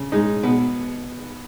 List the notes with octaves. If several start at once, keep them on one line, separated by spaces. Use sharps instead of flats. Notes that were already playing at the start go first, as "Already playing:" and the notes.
Already playing: C#3
G#3 D#4
B2 B3